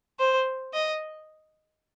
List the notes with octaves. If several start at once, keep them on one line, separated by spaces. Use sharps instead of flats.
C5
D#5